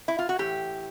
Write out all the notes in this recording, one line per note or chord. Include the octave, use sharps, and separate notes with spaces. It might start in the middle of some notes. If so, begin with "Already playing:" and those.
E4
F4
F#4
A2 E3 G4